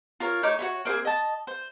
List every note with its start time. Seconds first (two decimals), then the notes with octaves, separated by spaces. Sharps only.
0.20 F4 A#4 C#5
0.43 A3 D#4 C#5 D6
0.59 F#4 B4 C#5
0.85 A#3 C4 D#4 G#4
1.05 D#5 A5
1.47 C5